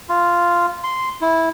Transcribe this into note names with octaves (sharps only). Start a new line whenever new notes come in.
F4
C6
E4